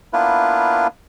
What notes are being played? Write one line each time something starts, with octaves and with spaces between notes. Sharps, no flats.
A#3 B3 D4 E4 F4 B4